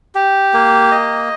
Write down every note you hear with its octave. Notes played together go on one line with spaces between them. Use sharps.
G4
A#3
D#5